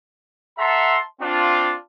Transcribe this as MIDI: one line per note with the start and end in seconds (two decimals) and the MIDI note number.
0.58 0.98 69
0.58 0.98 76
0.58 0.98 78
0.58 0.98 81
0.58 0.98 82
0.58 0.98 84
1.20 1.74 60
1.20 1.74 62
1.20 1.74 65